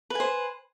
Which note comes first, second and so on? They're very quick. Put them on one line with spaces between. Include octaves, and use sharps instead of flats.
B4 G#5 C5